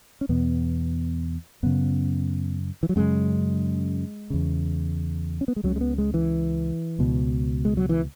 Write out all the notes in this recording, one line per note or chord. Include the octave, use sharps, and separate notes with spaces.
C#4
E2 B2 B3
F#2 C#3 B3
E3
F#3
F#2 C#3 G#3
E2 C#3
C#4
B3
G#3
C#2 C#3 F#3
G#3
B3
G#3
E3
C#2 B2
G#3
F#3
E3